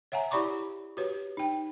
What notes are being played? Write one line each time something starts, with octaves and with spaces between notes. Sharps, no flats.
C#5 E5 F#5 G#5 A#5
E4 G4 D5 B5 C#6 D6
F#4 G4 B4 C#5
D#4 G5